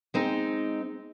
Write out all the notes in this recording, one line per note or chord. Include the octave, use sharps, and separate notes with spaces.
G#3 C4 D#4